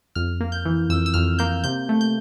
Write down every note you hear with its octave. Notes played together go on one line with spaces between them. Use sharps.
F2 F6
A#3
G6
E3
F2 E6
E6
F2 F6
A#3 G6
C3 G6
A3
G6